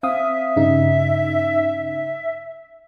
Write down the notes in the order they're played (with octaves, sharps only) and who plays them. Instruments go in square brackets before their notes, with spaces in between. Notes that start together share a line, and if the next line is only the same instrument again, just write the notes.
[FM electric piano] C4 F5 D#6 [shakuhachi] E5
[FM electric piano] G2 C#3 D#4